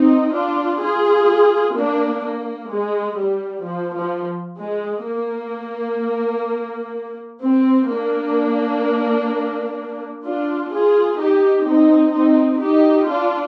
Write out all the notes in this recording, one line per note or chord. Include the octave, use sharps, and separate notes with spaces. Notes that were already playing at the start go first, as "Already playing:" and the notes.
Already playing: C4 D#4
D4 F4
F4 G#4
A#3 D4
A#3
G#3
G3
F3
F3
G#3
A#3
C4
A#3 D4
D4 F4
F4 G#4
D#4 G4
C4 D#4
C4 D#4
D#4 G4
D4 F4